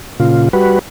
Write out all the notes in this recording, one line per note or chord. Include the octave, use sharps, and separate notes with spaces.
A#2 C#3 F4
G3 F#4 B4